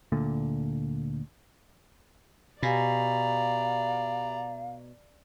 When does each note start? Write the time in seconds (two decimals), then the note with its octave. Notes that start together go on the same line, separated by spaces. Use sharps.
0.12 D2 A#2 D3
2.62 B2 G4 D5 F5 G#5 A#5 B5